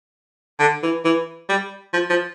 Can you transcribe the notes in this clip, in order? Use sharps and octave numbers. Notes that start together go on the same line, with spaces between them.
D3
E3
E3
G3
F3
F3